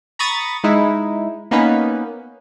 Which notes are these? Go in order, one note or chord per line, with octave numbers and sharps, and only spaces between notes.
A#5 B5 C#6 D#6 A6
G#3 D#4 E4
A#3 B3 C#4 D#4 B4